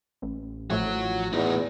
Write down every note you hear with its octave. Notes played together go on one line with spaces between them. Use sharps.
A1
A1 A2 F3 F#4 C#5
E2 A2 D#4